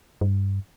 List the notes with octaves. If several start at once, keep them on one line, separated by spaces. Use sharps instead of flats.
G2